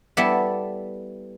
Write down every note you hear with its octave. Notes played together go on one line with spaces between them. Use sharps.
G3 B3 E4 A4 D5 E5